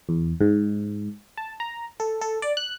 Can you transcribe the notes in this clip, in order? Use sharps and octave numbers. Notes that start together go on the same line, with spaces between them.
E2
G#2
A5
A#5
A4
A4
D5
F#6